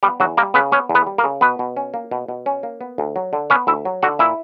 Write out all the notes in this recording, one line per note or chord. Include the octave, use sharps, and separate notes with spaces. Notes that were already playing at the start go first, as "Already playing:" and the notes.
G3 B3 G4
E2 F#3 F#4
G3 A#3 A#4
C#3 B3 B4
B3 C#4 C#5
E2
B3 B4
G3
A#3 A#4
C#3
B2 B3 B4
B2
C#4
A#3
B2
B2
C#4
A#3
B3
D2
F#3
D3
B3 C#4 C#5
D2 E4 E5
F#3
D3 F#4 F#5
A#2 E4 E5